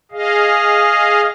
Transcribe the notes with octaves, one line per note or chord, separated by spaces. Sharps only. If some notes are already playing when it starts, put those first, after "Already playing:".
G#4 D#5 F5